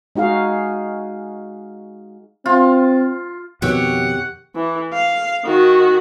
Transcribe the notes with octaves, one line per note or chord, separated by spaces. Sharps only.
G#3 D#4 F#4 G#4 F5
C4 F4
F2 B2 D#3 G4 C#5 E5 F#5
E3
F5
D#3 F#4